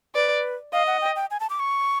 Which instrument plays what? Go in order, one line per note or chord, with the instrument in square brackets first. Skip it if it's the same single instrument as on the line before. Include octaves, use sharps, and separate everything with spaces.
[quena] B4 [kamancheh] D5
[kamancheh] D#5 [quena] F5
[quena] F#5
G5
G5
G#5
A5
D6
C#6